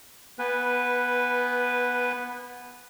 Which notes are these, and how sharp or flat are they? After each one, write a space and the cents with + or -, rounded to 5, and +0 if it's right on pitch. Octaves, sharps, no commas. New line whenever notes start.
B3 -15 B4 +0 G#5 -35